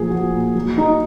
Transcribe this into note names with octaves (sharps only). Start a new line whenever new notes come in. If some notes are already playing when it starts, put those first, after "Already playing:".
Already playing: A#2 F3 A#3 G#4
F3 F#4
A#2
F#3
F#3 D#4